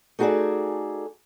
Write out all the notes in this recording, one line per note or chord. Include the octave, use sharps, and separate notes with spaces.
A3 D#4 F#4 G#4 A4 D5